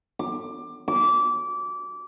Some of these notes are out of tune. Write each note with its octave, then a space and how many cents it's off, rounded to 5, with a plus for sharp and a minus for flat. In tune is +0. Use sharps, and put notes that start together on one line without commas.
D6 +20
D6 -20